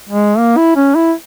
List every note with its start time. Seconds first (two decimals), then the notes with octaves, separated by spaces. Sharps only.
0.09 G#3
0.39 A#3
0.57 E4
0.76 C#4
0.96 E4